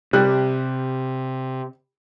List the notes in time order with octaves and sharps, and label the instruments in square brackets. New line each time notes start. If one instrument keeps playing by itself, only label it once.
[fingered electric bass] C3 [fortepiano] G3 F#6